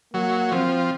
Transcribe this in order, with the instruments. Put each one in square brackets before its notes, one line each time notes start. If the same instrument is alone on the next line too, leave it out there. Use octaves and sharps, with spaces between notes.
[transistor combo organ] F#3 [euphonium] A#3
[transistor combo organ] F3 [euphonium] C4